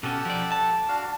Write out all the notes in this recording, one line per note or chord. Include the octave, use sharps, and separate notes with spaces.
B2 C#4 G4 A4 F#5
F3 D5
A5
D4 F#4 F5